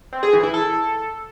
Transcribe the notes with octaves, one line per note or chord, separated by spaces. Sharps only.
C4
G#4
E3
E4
A4